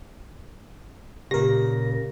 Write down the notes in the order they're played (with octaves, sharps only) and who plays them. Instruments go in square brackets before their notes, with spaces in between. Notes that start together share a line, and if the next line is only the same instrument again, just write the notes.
[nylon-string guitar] A#2 C#3 [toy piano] G4 [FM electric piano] A#4 A#6